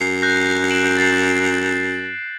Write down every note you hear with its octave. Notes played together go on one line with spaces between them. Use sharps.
F#2 C7
F#6 G6 A#6
D7 E7 F#7
A6 C7